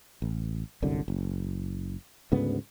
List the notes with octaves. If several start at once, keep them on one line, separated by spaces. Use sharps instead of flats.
A1
G1 C2 F#2 D3
F#1
D2 G#2 C#3 B3